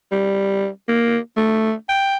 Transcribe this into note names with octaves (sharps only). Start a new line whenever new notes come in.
G3
A#3
A3
G5